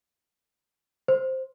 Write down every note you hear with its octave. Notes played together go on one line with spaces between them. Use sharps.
C5